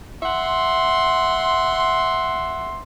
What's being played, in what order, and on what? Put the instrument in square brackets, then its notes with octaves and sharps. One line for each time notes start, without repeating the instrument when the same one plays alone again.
[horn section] E5 F#5 C6